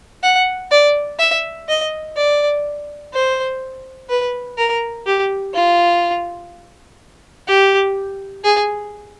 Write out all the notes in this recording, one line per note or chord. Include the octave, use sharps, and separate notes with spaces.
F#5
D5
E5
D#5
D5
C5
B4
A#4
G4
F4
G4
G#4